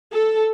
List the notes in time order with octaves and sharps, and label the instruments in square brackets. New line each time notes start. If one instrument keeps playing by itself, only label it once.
[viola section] A4